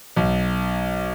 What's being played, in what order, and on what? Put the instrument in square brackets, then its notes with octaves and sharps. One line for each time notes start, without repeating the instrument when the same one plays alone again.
[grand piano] B1